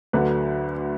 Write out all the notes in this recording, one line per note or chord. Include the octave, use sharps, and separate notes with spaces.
D2 D3 F#3 B4